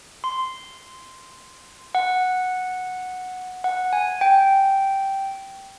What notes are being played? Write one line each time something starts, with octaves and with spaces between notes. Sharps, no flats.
C6
F#5
F#5
G#5
G5